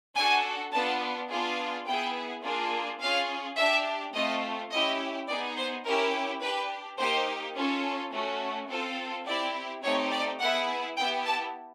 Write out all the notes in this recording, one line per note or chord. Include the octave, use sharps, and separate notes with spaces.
D4 F#4 A4 G#5
B3 D4 F4 A5
B3 D4 F4 G#4
B3 E4 G#4 G5
A#3 D4 F4 G#4
C#4 F4 G#4 F5
D4 G4 E5
A3 C4 F4 D#5
C#4 E4 G4 D#5
B3 D#4 G#4 D5
C5
C#4 E4 G4 A#4
D4 G4 B4
A#3 D#4 G4 C5
C#4 F4 A4
A3 C#4 F#4
C4 F4 A4
C4 E4 G4 D5
A3 C4 D#4 G4 C#5
D5
B3 E4 G#4 F#5
B3 E4 G4 G5
A5